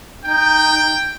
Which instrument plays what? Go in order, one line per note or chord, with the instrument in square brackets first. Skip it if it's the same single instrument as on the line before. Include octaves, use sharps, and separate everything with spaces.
[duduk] D#4 [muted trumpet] G5